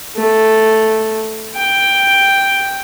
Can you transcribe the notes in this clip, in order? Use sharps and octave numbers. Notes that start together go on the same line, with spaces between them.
A3
G5